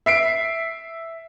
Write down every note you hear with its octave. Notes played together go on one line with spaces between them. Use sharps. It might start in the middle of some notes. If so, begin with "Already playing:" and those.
E5 C7 D7